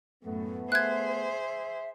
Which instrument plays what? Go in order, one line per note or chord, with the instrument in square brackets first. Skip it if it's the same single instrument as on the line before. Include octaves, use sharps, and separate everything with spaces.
[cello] F#2 A2 [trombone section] A3 B3
[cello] G#4 C5 [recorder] E5 [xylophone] F#6 G#6